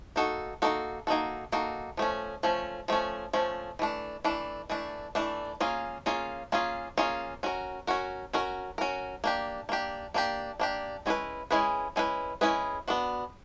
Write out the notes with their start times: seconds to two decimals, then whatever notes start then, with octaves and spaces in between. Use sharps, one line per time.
0.16 A#3 D#4 F#4 A4
0.62 A#3 D#4 F#4 A4
1.07 A#3 D#4 F#4 A4
1.52 A#3 D#4 F#4 A4
1.97 F3 A3 C#4
2.43 F3 A3 C#4
2.88 F3 A3 C#4
3.33 F3 A3 C#4
3.79 E3 A3 D4
4.24 E3 A3 D4
4.70 E3 A3 D4
5.15 E3 A3 D4
5.60 A#3 C#4 F4 G#4
6.06 A#3 C#4 F4 G#4
6.52 A#3 C#4 F4 G#4
6.98 A#3 C#4 F4 G#4
7.43 C#4 F#4 A#4
7.87 C#4 F#4 A#4
8.33 C#4 F#4 A#4
8.78 C#4 F#4 A#4
9.24 A#3 D4 G4
9.69 A#3 D4 G4
10.14 A#3 D4 G4
10.59 A#3 D4 G4
11.06 G#3 C#4 E4 G#4 B4
11.51 G#3 C#4 E4 G#4 B4
11.96 G#3 C#4 E4 G#4 B4
12.41 G#3 C#4 E4 G#4 B4
12.88 B3 D4 F#4